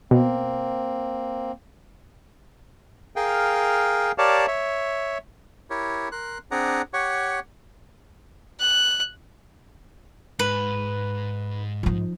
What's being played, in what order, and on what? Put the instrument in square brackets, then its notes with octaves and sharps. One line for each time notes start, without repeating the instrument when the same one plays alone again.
[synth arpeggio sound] B2 [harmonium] A#3 C4
[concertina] G#4 A#4 F5 G5
G4 A#4 C#5 D5 F5 A5
C#5 E5
E4 G4 A#4 C#5
A#4 C6 F#6
C4 D4 G#4 D5 F#5 A#5
G4 C#5 F#5 C#6
[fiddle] F#6
[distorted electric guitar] G#2 [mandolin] B4
[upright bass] F3 D#4